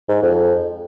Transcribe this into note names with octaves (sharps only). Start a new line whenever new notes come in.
G#2
F2